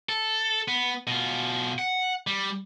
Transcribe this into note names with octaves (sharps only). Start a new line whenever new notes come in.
A4
B3
B2 F4
F#5
G3